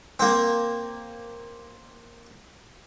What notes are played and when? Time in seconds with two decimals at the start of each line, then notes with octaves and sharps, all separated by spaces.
0.20 A#3 C4